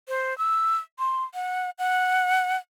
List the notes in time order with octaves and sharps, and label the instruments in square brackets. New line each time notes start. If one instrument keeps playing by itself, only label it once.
[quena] C5
E6
C6
F#5
F#5